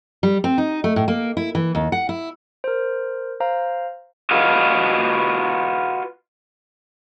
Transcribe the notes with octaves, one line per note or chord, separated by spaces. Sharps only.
G3
C4
D#4
A3
A2
A#3
E4
E3
D#2
F#5
E4
A#4 C5
C5 F5 A#5
F4 F#4 B4 D#5 F5